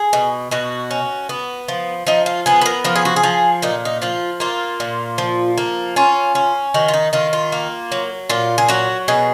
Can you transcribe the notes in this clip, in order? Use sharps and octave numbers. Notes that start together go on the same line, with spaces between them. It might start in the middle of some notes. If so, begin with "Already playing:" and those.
Already playing: G#4
B2
B2 F#4
C#4
B3
F3
F3 D#4
F4
B3 G#4
B4
A#4
F3 A#4
G#4
F#4
G#4
F3
A#2 D#4
D#4
F3 F4
A#3 F4
A#2
F3
A#3
C#4 F4
C#4
D#3 F#4
F4
D#4
D#3 F4
F4
A#3
F#3
A#2 F4
G#4
F#3 F#4
B2 G#4